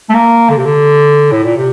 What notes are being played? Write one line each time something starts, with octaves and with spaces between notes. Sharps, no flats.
A3
A#3
D3
C3
D3
A2
A#2
C3